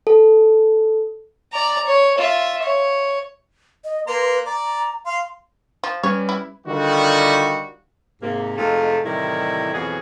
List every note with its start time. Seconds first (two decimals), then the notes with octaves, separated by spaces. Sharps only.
0.07 A4
1.53 D5 A#5
1.86 C#5
2.18 F4 E5
2.62 C#5
3.85 D#5
4.07 A#3 B4 A#5 C6
4.46 D5 A#5
5.06 F5 C6
5.84 F3
6.03 G3 C#4 B4 C#5
6.29 E4
6.67 D3 D#3 G3 F4 F#4
8.22 G#2 C3 A#3
8.57 F2 C3 G#3 A3 D#4 F4
9.04 A2 C3 D#3 E3 G3 E4
9.73 F2 B2 E3 F#3 F#4 G#4